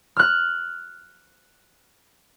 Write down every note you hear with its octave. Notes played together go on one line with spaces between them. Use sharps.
F6 F#6